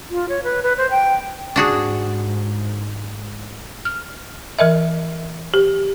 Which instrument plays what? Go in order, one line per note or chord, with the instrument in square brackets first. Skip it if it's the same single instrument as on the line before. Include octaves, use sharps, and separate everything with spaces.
[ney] F4
C#5
B4
B4
C5
G5
[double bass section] G#2 [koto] D4 F#4 G#4
[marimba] F6
E3 A#4 D#5 E5
G4